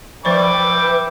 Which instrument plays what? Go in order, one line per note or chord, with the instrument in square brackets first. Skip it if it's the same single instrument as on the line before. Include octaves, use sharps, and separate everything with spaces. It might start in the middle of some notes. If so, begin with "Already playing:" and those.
[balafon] F3 C5 D5 [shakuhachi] B4 [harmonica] E5 B5 D6 [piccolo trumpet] G5